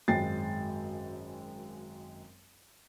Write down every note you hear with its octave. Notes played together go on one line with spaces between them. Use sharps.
G#1 F#2 G#3 G5 A6 C7